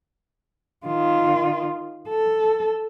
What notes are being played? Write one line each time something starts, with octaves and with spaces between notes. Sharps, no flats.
D#3 F4
A4